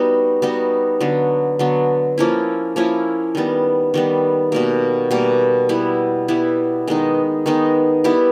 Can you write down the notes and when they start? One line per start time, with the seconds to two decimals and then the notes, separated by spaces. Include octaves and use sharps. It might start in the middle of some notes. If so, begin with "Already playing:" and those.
Already playing: G3 B3 D#4 F#4
0.42 G3 B3 D#4 F#4
1.00 D3 F#3 B3
1.59 D3 F#3 B3
2.18 F3 A#3 C#4 E4
2.76 F3 A#3 C#4 E4
3.35 D#3 G3 B3
3.94 D#3 G3 B3
4.52 B2 G3 A#3
5.11 B2 G3 A#3
5.69 G3 B3 E4
6.28 G3 B3 E4
6.87 D#3 G#3 B3 D#4
7.46 D#3 G#3 B3 D#4
8.04 G3 B3 E4 G4